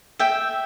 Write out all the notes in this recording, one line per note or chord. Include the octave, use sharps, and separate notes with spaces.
E5 G5